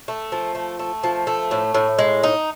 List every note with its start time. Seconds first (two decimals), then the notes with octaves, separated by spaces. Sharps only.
0.08 A3
0.32 F3
0.55 A3
0.79 A3
1.03 F3
1.27 A3
1.51 A2
1.74 A2
1.99 G#3
2.23 D#4